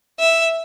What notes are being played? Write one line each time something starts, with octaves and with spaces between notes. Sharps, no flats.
E5